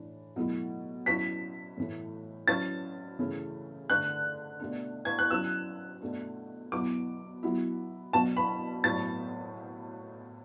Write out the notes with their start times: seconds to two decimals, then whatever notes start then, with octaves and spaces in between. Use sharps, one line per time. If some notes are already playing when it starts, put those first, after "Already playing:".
Already playing: A2 E3 D4
0.36 B2 F#3 A3 E4
1.06 F#3 C#4 E4 B6
1.77 A2 E3 A3
2.48 F#3 C#4 E4 A6
3.19 C#3 E3 A3 C#4 E4
3.89 D3 A3 D4 F#6
4.60 B2 A3 D4
5.05 G#6
5.19 F#6
5.30 F#3 C#4 E4 E6
6.01 B2 A3 D4
6.72 B2 F#3 B3 E4 D6
7.43 F#3 B3 E4
8.13 B2 F#3 B3 D4 A5
8.37 B5
8.84 A2 F#3 B3 A6